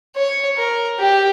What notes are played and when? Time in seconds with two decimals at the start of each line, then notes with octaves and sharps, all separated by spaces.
0.17 C#5
0.57 A#4
1.00 G4